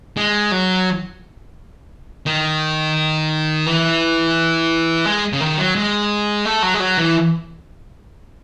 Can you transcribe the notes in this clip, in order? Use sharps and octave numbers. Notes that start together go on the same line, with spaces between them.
G#3
F#3
D#3
E3
G#3
C#3
D#3
F#3
G#3
A3
F#3
G#3
F#3
E3